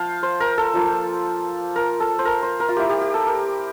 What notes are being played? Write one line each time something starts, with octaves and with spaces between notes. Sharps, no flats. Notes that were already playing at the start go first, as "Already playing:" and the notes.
Already playing: F3 F5 G5 A5
C5
A#4
A4
F3 A#3 F4
A#4
A4
C5
A#4
C5
A#4
F4
A#3 E4 G4
G4
G4
A4
A#4